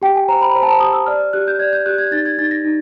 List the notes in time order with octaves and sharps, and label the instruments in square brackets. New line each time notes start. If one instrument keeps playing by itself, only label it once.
[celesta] G4 G5
G#5
C5 A#5
B5
C5 A#5
A5
A#5
G4 D#6
E6
D5 F6
G4 F#6
G6
D5 G#6
G6
G4 F#6
G#6
D#4 A6
G#6
D#4 A6
A#6
D#4